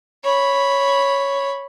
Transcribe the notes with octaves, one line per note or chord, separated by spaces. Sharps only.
C#5 B5